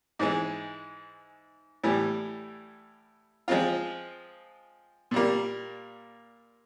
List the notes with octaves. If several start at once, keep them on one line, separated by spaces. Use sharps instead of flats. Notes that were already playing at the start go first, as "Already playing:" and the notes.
G#2 E3 G#3
A2 E3 G3
F3 G#3 C4 F4
A#2 G3 A#3